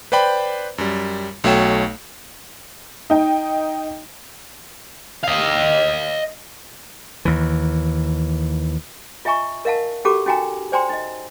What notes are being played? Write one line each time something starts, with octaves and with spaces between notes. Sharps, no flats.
B4 C5 D5 G5 B5
F#2 G3
B1 A3 F#4 C#5 G5 E7
D#4 G5
D#5 F5
D#2 E3
F4 D#5 E5 G#5 A#5 C#6
A#4 D#5 F5 F#5 A5
C#4 F#4 G4 A4 A#5 D6
C#4 D#4 F#4 G5 G#5 A#5
C5 D5 G5 G#5 A#5 C6
D#4 D#5